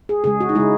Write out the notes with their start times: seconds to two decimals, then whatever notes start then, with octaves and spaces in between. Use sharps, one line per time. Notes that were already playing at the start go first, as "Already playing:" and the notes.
0.09 G#4
0.24 C#3 G#3 G#4
0.40 F#4
0.49 D#4
0.55 C#3 G#3 E4